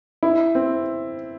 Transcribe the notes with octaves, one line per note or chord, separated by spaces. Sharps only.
E4
C4